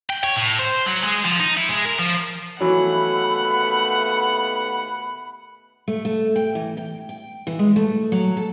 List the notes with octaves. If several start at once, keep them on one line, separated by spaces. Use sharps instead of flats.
G5
C#5
A2
C5
F#3
G#3
F3
D#4
E4
G#3
A#4
F3
D#2 E3 F#3 A3 B3 F#5 B5
A3
A3
G5
E3
G5
G5
E3
G#3
A3
F#3
A4